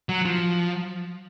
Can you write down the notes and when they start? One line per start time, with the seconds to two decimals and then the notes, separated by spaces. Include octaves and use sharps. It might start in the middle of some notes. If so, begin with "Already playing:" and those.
0.09 F#3
0.25 F3